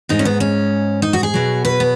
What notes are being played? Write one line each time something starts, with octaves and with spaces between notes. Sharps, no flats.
G#2 G#3 D#4
C#4
B3
C#4
D#4
F#4
G#4
B2 F#3
B4
B3